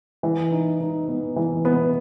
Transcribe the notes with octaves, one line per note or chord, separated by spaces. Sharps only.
E3
D#4
D#4
B3
E3
B3